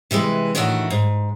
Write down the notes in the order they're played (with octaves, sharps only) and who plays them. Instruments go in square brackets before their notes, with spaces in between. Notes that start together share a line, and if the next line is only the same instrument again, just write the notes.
[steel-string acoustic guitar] C3 E3 G#3 B4
A2 D#3 E3 D4 E4 F#4
G#2